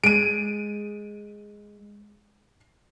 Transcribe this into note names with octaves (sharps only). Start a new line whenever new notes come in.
G#3 D7 D#7